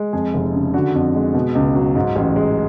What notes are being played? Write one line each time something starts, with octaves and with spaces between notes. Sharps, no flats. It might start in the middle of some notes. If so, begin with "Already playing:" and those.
Already playing: G#3
F2 G#4
F1
C#3
D3 F#4
F2
G#3
B2
C#2
F#3
G#2
A1
G#3